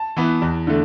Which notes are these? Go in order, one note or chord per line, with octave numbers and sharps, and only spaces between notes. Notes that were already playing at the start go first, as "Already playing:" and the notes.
Already playing: A5
E3 B3
E2
D3 A3